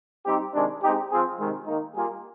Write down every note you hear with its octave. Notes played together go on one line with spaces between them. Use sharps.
G3 C4 D#4 G4
C3 D#3 G#3 D4
G#3 C4 D#4 G4
F3 C4 F4 G#4
C3 D#3 G#3
D#3 A#3 D#4
G3 A#3 F4 G#4